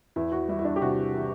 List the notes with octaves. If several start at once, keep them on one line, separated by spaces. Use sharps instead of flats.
E2 E4
F#4
G3 E4
E4
D4
G4
C3 F#4
E3